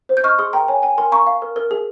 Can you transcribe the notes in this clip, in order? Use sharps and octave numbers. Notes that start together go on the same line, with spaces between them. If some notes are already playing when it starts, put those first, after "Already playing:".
C5
G6
D#5 C#6 F6
G#4 C6 D#6
A#4 G5 A#5
C#5 G#5
G5 G#5
A#4 G#5 C6
F5 A#5 C#6
F5
A#4
A#4
G#4